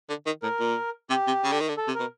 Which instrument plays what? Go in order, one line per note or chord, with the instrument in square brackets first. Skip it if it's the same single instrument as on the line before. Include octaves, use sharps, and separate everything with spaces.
[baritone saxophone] D3
D#3
[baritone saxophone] A2 [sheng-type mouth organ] A#4
[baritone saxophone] A#2
[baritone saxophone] C3 [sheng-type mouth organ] G4
[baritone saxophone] C3
C#3
D3
D#3
D3
[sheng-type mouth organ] A4
[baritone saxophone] C3
[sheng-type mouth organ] A#4
[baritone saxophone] B2